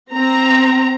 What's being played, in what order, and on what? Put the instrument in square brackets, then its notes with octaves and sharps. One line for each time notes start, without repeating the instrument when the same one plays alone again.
[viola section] C4 A#5